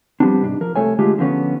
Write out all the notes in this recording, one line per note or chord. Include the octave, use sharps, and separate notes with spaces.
F3 G3 B3 C4 D4
C2 G#2 D4
F3 A#4
C2 A3 A4 C#5 G#5
D3 G#3 A3 F4 G4 G#4
D3 F3 B3 C#4